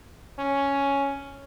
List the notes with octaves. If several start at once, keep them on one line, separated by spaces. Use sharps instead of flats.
C#4